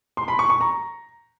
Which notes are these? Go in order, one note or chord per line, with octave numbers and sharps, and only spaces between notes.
C6
B5
C#6
C#6
A#5